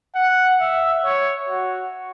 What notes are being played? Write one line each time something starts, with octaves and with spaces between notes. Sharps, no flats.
F#5
E5
C#5
F#4